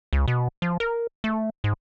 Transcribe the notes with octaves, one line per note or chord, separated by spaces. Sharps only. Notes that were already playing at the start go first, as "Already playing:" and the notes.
C#2
B2
F3
A#4
A3
G#2